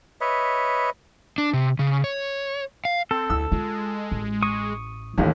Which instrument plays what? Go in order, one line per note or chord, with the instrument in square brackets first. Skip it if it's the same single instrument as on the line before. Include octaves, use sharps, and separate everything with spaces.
[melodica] B4 C#5 D#5 E5
[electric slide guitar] D4
C3
C#3
C#5
F5
[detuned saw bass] C4 [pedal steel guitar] A4
[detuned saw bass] D2 [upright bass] E4 [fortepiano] E6
[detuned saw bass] G#3 [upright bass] F4
[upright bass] A1
[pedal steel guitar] C#6 D#6
[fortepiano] A1 D#2 [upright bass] E3 F4